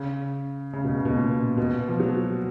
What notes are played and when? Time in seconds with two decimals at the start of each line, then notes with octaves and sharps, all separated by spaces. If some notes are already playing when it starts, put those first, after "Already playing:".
Already playing: C#3
0.73 C#3
0.84 B2
0.95 C#3
1.05 B2
1.16 A#2
1.58 B2
1.88 F3
2.00 F#3